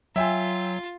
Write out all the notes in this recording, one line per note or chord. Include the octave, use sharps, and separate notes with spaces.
F#3 F4 E5 G5 G#5